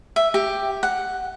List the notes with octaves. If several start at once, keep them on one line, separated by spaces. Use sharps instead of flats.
E5
G4
F#5